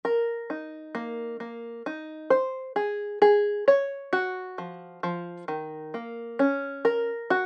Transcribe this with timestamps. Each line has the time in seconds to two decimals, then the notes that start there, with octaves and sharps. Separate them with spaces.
0.05 A#4
0.50 D#4
0.95 A#3
1.40 A#3
1.86 D#4
2.30 C5
2.76 G#4
3.22 G#4
3.68 C#5
4.13 F#4
4.58 F3
5.03 F3
5.48 D#3
5.94 A#3
6.39 C#4
6.85 A#4
7.30 F#4